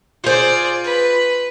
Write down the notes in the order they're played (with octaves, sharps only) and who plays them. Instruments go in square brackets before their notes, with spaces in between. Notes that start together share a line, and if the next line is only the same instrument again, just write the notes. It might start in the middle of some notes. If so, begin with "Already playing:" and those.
[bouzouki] F4 C5 [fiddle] G#4 D5
[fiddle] B4